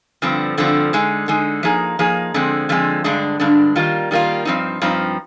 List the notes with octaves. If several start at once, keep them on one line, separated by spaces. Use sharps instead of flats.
G2 D3 F3 C4
G2 D3 F3 C4
D3 G#3 D#4
D3 G#3 D#4
F3 A#3 D#4 G#4
F3 A#3 D#4 G#4
D3 F3 G#3 C4
D3 F3 G#3 C4
G2 D3 G#3 D4
G2 D3 G#3 D4
D#3 G3 A#3 F4
D#3 G3 A#3 F4
G2 F3 C4 D#4
G2 F3 C4 D#4